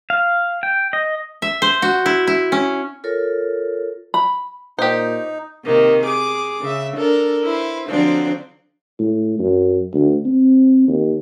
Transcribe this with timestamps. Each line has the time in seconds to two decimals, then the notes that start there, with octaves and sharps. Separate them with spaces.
0.10 F5
0.63 G5
0.93 D#5
1.42 E5
1.62 C5
1.82 F#4
2.06 E4
2.27 E4
2.52 C#4
3.04 F4 A4 A#4 C#5
4.14 B5
4.79 A#2 D#4 G4 C5
5.65 C3 D#3 A#3
6.03 G#4 D6
6.62 C#3 E5
6.97 D4 A4 A#4
7.45 E4 B4 C5
7.88 D3 F3 F#3 C4 D4
8.99 A2
9.39 F#2
9.94 D2
10.25 C4
10.88 D#2